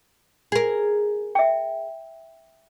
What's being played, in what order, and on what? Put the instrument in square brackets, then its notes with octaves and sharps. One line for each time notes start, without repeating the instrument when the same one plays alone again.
[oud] G#4 A#4
[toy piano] E5 G5